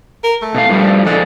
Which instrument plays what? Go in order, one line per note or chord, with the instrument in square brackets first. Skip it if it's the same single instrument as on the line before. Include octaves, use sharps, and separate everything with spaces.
[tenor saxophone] A#4
A3
[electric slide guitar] B2 F5
G2 F3 G3
[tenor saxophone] D3 [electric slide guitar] F3 G#3 D5